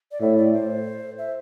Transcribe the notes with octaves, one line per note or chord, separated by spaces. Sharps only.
D5
A2 E5
D5
C5
E5